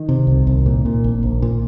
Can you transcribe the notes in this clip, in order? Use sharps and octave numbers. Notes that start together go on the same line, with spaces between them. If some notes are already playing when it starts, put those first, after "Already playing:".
Already playing: D#3
C3
C2
C2
A#2
A#2
A#1
A#1
A#2